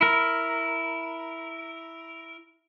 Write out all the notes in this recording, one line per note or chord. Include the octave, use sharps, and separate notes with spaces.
E4 A#4